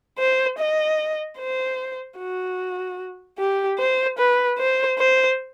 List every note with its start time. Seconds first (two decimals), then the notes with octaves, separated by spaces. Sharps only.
0.19 C5
0.59 D#5
1.39 C5
2.19 F#4
3.39 G4
3.79 C5
4.18 B4
4.58 C5
4.98 C5